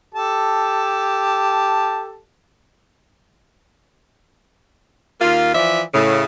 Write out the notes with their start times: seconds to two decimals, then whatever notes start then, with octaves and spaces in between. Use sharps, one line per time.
0.14 G4 A4 A5
5.20 D#2 A#3 F4
5.54 E3 F3 D5 E5
5.93 A2 C#3